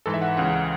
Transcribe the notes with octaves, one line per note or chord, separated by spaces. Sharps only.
G#2 E3 A4
E5
F#5
C#2 C#3 E3 F#5